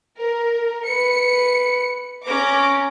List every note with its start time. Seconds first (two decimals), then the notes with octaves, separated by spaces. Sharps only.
0.20 A#4
0.86 B4 C#7
2.27 C#4 A#5 D6 A#6